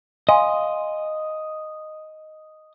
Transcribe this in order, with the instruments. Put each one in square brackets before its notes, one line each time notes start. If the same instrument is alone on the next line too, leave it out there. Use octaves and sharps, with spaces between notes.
[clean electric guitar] D#5 [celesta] F5 G#5 C6